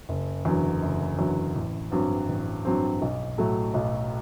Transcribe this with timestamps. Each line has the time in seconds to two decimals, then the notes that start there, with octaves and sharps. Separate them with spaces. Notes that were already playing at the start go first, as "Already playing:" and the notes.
0.09 F#1
0.45 E2 D3 F#3
0.82 F#1
1.18 E2 D3 F#3
1.55 A1
1.92 G2 F#3 C4
2.28 A1
2.65 G2 F#3 C4
3.02 B1
3.38 A2 F#3 A3
3.74 B1